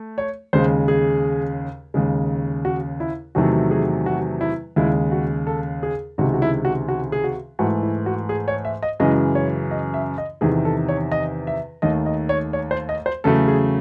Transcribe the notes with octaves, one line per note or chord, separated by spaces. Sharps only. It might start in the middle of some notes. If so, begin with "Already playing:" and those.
Already playing: A3
C#5
D#2 C#3 G#3 C5
G#4
D#2 C#3 G#3
F#4
E4
E2 C3 D#3 F#3 A3 F#4
G#4
F#4
E4
D#2 C#3 G#3 E4
F#4
A4
G#4
C#2 C3 D#3 G#3 F#4
F#4
E4
F#4
F#4
G#4
F#4
G#2 E3 A3 F#4
E4
F#4
G#4
C#5
E5
D#5
F#2 C#3 E3 G#3 D#5
C#5
D#5
E5
D#5
E2 C3 D#3 G#4
A4
C#5
D#5
E5
D#2 D#3 A3 D#5
D#5
C#5
C#5
C5
D#5
C5
E2 C#3 F#3 A3 A4
G#4